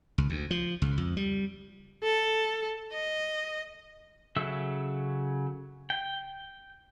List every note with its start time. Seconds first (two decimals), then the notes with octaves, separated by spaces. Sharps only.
0.18 C#2
0.30 D2
0.51 F3
0.82 C#2
0.98 F2
1.17 G3
2.03 A4
2.93 D#5
4.36 C#3 F#3 A4 E5 E6
5.90 G5